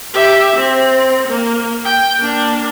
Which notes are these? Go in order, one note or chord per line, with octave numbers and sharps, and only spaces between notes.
G4 E5
C4
A#3
G5
A#3 D4